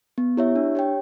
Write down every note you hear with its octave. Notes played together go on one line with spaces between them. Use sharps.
B3
E4 G4 C#5 E5
D4
G4 C#5 G5